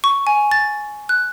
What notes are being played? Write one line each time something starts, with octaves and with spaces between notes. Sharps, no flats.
C#6
G#5
A6
F#6